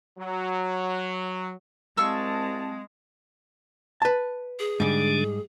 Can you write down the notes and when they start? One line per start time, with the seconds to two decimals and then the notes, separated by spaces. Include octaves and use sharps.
0.18 F#3
1.97 C2 G#3 C4 F5 A5 C#6 E6
4.02 B4 A5
4.59 G#4
4.80 G#2 D3 G3 G#3 D4